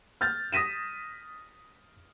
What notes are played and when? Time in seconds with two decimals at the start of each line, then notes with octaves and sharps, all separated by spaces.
0.21 F6 G6 A6
0.52 D#6 A#6 B6 D#7 E7